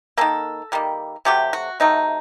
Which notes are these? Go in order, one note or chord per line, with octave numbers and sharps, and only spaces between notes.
D#3 G3 A#3 A4
D#3 G3 A#3
C3 F#3 A3 G4
F#4
C3 F#3 A3 D#4